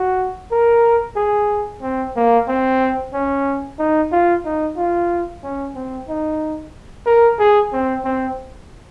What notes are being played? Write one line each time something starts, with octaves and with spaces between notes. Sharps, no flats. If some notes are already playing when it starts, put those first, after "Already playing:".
Already playing: F#4
A#4
G#4
C4
A#3
C4
C#4
D#4
F4
D#4
F4
C#4
C4
D#4
A#4
G#4
C4
C4